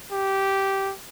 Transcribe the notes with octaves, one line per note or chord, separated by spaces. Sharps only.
G4